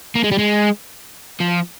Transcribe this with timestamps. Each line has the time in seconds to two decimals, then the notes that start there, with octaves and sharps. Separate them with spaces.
0.15 A#3
0.24 G#3
0.32 G3
0.39 G#3
1.40 F3